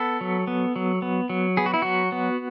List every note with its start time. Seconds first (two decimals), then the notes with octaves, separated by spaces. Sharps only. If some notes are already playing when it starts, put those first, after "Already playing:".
Already playing: B3 A4
0.21 F#3
0.47 B3
0.76 F#3
1.02 B3
1.29 F#3
1.57 B3 G#4
1.66 F#4
1.74 E4
1.82 F#3 F#4
2.12 B3